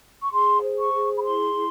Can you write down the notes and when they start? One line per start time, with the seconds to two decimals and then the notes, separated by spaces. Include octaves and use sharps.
0.21 C#6
0.31 G#4 C6
0.62 C5
0.77 C#6
0.92 G#4
1.16 B5
1.23 E4 C6
1.54 E4